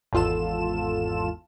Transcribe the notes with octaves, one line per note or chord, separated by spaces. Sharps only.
G#1 E2 F4 A4 E7